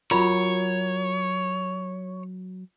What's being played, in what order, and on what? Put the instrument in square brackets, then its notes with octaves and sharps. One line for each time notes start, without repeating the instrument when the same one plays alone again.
[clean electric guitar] F#3 F#4 A#4 [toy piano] F4 B5 [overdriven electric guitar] C#5